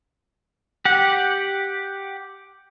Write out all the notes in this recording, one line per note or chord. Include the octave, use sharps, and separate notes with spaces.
G4 F#5